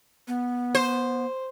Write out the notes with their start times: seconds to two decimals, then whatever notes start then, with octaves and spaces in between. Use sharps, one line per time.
0.28 B3
0.75 C5